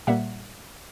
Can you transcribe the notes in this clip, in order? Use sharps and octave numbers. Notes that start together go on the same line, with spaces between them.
A#2 G3 A#3 E5 F#5